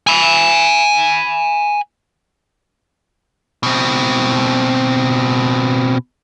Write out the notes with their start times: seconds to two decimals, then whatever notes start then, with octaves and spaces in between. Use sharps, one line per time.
0.07 G#5 B5
3.63 B2 C4